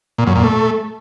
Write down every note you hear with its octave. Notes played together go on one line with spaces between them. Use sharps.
A#2
F#2
A#2
A3